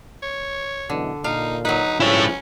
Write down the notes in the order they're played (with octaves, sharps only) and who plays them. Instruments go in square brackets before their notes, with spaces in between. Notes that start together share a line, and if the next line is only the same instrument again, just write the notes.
[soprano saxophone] C#5
[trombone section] F#2 B2 E3 [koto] D3
[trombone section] A#2 [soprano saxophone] D#4 [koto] F5
[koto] F#3 B4 [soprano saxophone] D#4
[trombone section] G2 C#3 F3 [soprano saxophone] C#4 [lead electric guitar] E4 C#5